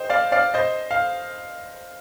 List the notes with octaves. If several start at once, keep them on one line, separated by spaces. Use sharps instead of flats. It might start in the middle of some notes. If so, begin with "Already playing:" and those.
Already playing: G4 C5 D#5
D5 F5
D5 F5
C5 D#5
F5